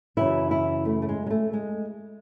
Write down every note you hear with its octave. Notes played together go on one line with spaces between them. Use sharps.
F#2 C#3 E3 E4
E4
A3
A3
G#3
G#3
A3
G#3